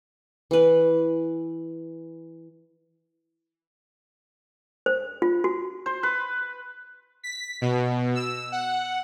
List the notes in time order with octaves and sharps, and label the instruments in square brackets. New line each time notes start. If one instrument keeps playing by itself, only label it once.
[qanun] E3 B4
[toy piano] C5
F4
F#4
[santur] C5
B4
[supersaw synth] B6
B2
E6
F#5